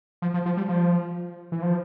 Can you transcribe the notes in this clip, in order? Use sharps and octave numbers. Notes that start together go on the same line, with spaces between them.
F3
F3
F3
G3
F3
E3
F3